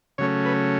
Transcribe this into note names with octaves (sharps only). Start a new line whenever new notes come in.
C#3 F#3 A3 C#4 C#5
B4